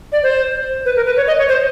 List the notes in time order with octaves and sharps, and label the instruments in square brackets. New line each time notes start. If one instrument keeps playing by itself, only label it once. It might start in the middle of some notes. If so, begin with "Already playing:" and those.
[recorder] D5
C5
B4
A#4
B4
C#5
D#5
C#5
C5